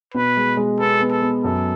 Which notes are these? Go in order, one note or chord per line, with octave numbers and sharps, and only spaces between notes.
B2 B4
G#3
G#3
B3 A4
B3
A4
B3
F#2 A4